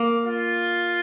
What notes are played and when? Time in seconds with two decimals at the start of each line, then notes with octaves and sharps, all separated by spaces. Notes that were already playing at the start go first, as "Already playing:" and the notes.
Already playing: A#3
0.24 F4